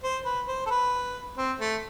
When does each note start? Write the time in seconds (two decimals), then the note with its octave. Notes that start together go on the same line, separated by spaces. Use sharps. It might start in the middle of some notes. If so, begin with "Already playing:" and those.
0.03 C5
0.25 B4
0.48 C5
0.66 A4
0.70 B4
1.37 C4
1.60 A3